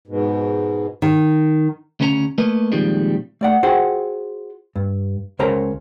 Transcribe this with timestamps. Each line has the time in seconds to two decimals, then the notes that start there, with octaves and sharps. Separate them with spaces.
0.07 G#2 B2
1.02 D#3
2.00 D2 C#3 C#4 C5 C#5 A#5
2.38 A3 A#3 B4 D#5
2.72 A#2 D#3 F3 G3 G#3 C4
3.41 A3 D5 F#5
3.63 F4 F#4 G#4 C5 F#5 G5
4.76 G2
5.39 C#2 C#3 A#4 C5 C#5 A#5